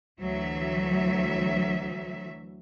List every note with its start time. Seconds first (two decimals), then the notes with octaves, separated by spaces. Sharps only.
0.19 D2 E3 F#3 E5